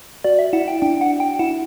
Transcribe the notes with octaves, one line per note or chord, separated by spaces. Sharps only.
F#4 D5
E5
E4 F#5
G5
D4 G5
F#5
G5
E4 F#5